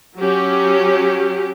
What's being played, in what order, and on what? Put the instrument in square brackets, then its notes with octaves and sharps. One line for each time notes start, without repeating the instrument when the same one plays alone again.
[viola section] F#3 C#4 G4